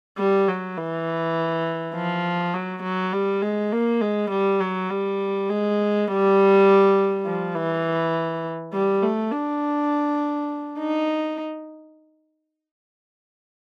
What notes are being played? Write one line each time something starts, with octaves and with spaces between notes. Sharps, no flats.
G3
F#3
E3
F3
F#3
F#3
G3
G#3
A#3
G#3
G3
F#3
G3
G#3
G3
F3
E3
G3
A3
D4
D#4